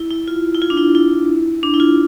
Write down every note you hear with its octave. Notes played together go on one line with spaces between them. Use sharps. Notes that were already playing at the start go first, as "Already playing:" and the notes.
Already playing: E4
E4
F4
E4
F4
D4
E4
E4
D4
E4
F4